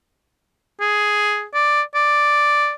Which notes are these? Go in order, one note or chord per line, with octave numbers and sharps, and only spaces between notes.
G#4
D5
D5